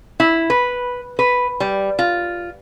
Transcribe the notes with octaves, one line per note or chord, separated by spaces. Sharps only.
E4
B4
B4
G3
F4